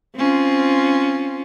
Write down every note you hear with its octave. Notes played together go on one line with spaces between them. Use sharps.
C4 C#4 F4